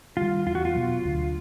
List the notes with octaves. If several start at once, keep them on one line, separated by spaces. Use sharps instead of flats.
D#3 G3 F4
E2 F4
F#4
F4
B2 F#3
D2